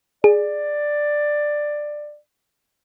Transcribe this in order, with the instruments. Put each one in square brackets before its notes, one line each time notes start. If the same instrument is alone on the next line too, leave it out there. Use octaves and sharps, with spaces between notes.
[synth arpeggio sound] G#4 [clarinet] D5